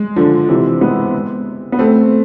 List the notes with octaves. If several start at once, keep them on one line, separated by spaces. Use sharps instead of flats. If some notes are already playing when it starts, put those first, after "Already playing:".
Already playing: G#3
D3 F3
C3 E3
G#3 B3
B3
A3 C4